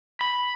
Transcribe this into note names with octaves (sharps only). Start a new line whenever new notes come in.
B5